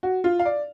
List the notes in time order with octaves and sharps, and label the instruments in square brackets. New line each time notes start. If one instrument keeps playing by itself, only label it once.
[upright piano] F#4
F4
F5
D5